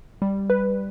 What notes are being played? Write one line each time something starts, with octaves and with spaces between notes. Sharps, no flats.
G3
B4